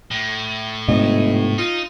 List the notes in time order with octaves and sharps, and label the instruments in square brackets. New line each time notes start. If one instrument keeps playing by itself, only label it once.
[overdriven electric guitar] A2
[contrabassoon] G1 [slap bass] G#2 C3 A3 [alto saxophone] D#5
[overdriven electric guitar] D#4 [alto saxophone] F4